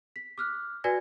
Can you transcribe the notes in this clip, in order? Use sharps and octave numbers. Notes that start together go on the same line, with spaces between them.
B6
D6 F6 F#6
F#4 B4 D5 G#5 G#6 A#6